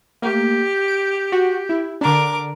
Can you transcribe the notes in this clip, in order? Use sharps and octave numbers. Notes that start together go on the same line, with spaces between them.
A3 A#3 G4
D7
F#4
E4
D3 D4 A#4 D6